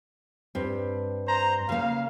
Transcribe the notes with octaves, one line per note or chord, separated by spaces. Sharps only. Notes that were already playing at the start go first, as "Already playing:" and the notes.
G2 C4
C5 A#5
C#3 A#3 F5